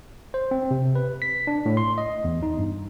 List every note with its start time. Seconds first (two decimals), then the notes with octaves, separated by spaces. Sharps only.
0.34 C5
0.51 C4
0.71 C3
0.95 B4
1.22 B6
1.47 D4
1.66 A2
1.77 C6
1.98 D#5
2.24 E2
2.43 D#4
2.58 G2